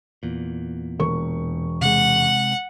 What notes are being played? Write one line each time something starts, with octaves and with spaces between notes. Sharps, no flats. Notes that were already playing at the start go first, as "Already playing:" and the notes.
E2 A#2
E1 A#4 C#6
C3 G#3 F#5